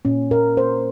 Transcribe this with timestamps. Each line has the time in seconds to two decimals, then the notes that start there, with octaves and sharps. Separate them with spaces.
0.05 A#2 C#4
0.31 A#2 A#4
0.57 A#3 C5